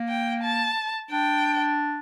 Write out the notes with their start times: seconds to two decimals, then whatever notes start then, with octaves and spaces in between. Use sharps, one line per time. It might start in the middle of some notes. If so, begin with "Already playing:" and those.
Already playing: A#3
0.09 G5
0.43 A5
1.11 D4 G5